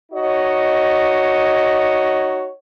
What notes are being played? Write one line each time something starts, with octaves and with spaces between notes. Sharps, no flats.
D#4 F#4 C#5 D#5